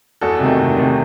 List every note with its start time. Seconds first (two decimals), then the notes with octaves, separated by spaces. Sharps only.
0.21 E2 F#4 A4
0.40 C3 D#3 A3
0.58 E2
0.77 C3 D#3 A3